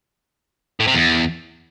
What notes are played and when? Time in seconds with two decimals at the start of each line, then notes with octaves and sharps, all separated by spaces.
0.80 A2
0.87 C3
0.95 E2